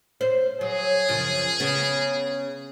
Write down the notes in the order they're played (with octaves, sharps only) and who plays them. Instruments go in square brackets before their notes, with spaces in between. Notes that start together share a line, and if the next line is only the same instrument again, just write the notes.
[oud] C5
[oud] F#3 [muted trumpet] G#4
[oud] F#2 C#3 F3
C#3 B3